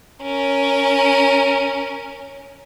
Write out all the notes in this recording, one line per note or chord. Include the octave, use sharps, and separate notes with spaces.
C#4 A#4